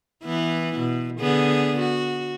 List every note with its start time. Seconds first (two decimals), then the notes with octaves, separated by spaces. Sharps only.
0.24 E3 B3 E4
0.79 B2
1.20 D3 B3 G#4
1.79 F#4